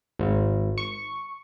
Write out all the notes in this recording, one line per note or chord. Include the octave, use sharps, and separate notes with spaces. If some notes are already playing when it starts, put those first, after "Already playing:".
G#1
C#6